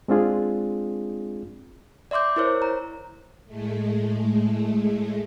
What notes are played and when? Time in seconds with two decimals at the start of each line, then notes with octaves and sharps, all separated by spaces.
0.08 G#3 C4 D4 F4 G#4
2.11 D5 E5 C6 D6 G6
2.36 E4 A#4 C5 C#5
2.62 A#5
3.46 A2 G#3 A3